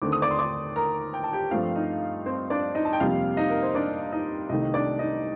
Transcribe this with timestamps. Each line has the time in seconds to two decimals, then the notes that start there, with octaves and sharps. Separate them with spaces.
0.02 D#2 D3 A3 C4 D6
0.12 D#6
0.22 D5 D6
0.31 C6
0.39 D5 D6
0.76 A#4 A#5
1.14 G5
1.24 A5
1.33 G4 G5
1.51 G2 F3 A3 C4 F4 F5
1.75 D#4 D#5
2.26 C4 C5
2.50 D4 D5
2.75 D#4 D#5
2.85 A5
2.93 G5
3.00 F2 C3 G3 A#3 F4 F5
3.37 D#4 D#5
3.50 A#4
3.62 C5
3.75 D4 D5
4.12 D#4 D#5
4.49 C2 C3 D#3 A3 D#4 D#5
4.62 D#5
4.74 D4 D5
4.99 D#4 D#5